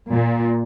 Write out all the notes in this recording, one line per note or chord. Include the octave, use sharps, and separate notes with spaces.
A#2